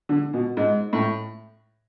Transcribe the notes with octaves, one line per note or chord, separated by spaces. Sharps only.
D3
B2
G#2
A2